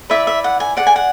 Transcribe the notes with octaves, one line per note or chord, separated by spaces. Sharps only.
E4 B4 D5 E5
E5
F#5
G#5
G#4 D5 F#5
G#5
F#5